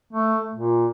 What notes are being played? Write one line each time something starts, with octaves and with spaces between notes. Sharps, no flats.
A3
A#2